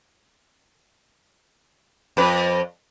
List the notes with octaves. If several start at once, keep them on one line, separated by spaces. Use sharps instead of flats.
F2 B4